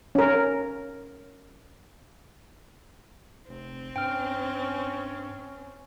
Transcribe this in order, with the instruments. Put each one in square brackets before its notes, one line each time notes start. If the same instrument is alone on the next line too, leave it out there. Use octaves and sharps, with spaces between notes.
[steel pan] C#4 A#4
[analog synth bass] F1 [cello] C4
[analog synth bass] G2 [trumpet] C#4 [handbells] G5 F6